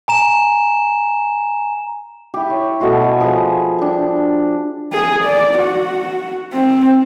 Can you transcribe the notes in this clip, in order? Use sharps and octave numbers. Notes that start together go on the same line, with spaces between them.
G#5 A#5 E7
E4 G4
C#5
B2 A3 F#4 C6
G#5
F3 G#4 F#5 B5
D4 G5
G#4
D5
F#4
C4